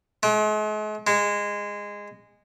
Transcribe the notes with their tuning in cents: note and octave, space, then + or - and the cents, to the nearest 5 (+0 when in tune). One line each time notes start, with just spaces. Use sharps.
G#3 +45
G#3 -15